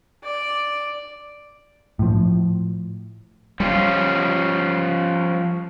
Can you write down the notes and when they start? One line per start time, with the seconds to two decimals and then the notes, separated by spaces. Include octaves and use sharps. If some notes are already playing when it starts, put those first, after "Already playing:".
0.24 D5
1.99 A2 F3
3.60 F3 G3 C#4 F4